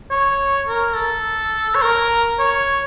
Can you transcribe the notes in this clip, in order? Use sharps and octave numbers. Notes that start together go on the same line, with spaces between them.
C#5
A#4
A4
C#5
A#4
C#5